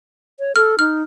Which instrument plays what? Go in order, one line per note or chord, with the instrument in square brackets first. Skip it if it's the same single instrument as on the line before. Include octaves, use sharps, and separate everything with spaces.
[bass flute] C#5
[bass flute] A4 [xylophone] F6
[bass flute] D#4 [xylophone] F6